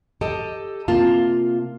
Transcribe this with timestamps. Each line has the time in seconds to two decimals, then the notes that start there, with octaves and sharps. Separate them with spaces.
0.21 G4 A4 D#5
0.88 C3 A#3 F4 A5